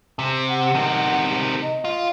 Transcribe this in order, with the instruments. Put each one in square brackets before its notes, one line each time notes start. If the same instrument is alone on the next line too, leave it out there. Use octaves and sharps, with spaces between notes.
[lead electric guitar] C3
[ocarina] F#5
[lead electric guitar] C3 D#3
[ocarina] D#5
[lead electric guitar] F4